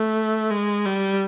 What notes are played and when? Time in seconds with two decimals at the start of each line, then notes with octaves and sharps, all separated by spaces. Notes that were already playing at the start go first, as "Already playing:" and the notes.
Already playing: A3
0.50 G#3
0.86 G3